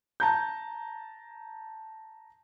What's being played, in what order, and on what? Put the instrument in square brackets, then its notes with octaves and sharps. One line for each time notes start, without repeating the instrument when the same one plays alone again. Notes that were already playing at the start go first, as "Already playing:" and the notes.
[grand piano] A5 A#5 G6